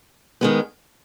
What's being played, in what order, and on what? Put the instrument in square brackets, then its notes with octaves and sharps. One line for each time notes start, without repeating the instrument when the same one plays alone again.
[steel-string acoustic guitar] D#3 G#3 B3